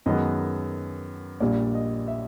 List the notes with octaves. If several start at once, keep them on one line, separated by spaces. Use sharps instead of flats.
F#2 D#3 G#3 B3 D#5
A#1 A#2 G3 D5
D#5
E5